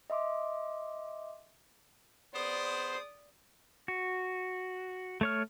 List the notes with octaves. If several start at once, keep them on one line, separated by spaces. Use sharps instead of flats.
D#5 E5 C6 D6
B3 G#4 C5 D5 D#6
F#4
A3 C#5 F6